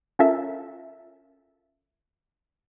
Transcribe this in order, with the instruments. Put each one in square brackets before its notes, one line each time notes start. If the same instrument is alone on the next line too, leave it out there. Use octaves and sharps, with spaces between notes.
[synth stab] C#4 F4 A4 A#4 E5